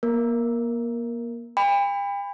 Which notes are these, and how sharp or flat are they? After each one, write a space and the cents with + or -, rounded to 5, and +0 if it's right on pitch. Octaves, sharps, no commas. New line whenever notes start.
A#3 +30 A#4 +0
G5 +40 B5 +20